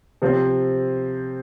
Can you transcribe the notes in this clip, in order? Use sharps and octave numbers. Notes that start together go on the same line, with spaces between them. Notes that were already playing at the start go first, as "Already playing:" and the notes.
C3 F3 C4